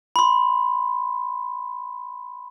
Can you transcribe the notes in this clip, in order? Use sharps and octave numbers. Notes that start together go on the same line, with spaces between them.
B5 C6